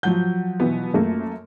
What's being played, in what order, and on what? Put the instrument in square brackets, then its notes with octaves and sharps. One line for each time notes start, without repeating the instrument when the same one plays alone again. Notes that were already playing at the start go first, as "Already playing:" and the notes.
[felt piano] F3 F#3 G6 [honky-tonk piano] F#5
[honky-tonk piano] B2 E3 B3
F#2 A3 A#3